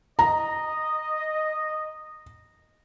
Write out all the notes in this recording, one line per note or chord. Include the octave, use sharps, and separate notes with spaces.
D#5 A#5